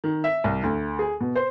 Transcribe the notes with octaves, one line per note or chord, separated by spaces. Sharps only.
D#3
E5
C2
D2
G#4
B2
C5